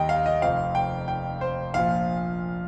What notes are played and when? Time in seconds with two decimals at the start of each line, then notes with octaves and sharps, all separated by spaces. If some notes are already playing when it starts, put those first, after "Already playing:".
Already playing: D#2 D#3 G3 D#5 G5
0.09 F5
0.26 D#5
0.42 F1 F2 F3 C4 F5
0.75 G5
1.08 G5
1.41 C5
1.74 A#1 A#2 F3 F5